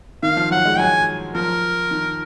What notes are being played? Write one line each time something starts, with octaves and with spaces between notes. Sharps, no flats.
D#3 F5
F3
F#3 F#5
G#3
F#3 G#5
F3 A#4
D#3